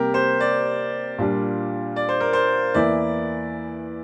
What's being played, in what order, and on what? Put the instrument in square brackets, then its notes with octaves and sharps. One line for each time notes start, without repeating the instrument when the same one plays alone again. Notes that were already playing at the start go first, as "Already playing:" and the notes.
Already playing: [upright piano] C3 G3 A#3 [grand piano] G4 A#4
[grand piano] C5
D5
[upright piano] A#2 G3 D4 F4
[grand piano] D5
C5
A#4
C5
[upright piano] E2 E3 A#3 E4 [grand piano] D5